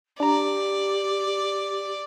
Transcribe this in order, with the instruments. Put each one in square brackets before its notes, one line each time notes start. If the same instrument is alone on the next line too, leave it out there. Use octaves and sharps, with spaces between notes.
[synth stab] D4 A#5 [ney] G4 [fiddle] D5